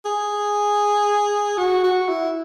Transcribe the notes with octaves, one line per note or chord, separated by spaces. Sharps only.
G#4
F#4
F#4
E4